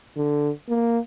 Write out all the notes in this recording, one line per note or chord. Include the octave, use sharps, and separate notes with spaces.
D3
A#3